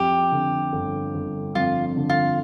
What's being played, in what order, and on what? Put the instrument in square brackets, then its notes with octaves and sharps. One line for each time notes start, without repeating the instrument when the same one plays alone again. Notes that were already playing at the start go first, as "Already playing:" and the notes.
Already playing: [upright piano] F2 [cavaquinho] G4
[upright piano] D3
G1
G1
[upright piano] F2 [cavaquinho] F4
[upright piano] D3
[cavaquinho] F4